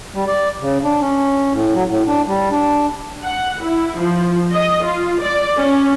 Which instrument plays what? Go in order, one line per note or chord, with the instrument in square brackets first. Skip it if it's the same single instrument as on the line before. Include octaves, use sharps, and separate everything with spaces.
[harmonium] G3
D5
C#3
D4
C#4
A2
F#3
A2
D4
G3
D4
[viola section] F#5
E4
F3
D#5
F4
D5
C#4